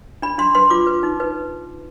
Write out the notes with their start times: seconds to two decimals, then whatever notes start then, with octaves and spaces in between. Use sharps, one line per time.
0.22 D4 B5
0.38 D4 C6
0.55 B4 C6
0.70 F4 D6
0.87 B4
1.03 D#4
1.20 B4